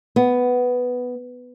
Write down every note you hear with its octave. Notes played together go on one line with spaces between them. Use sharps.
B3